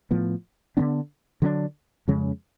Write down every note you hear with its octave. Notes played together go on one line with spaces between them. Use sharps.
A2 F3 B3
D3 F#3 B3 D4
D3 F#3 B3 D4
F2 C#3 G#3 C#4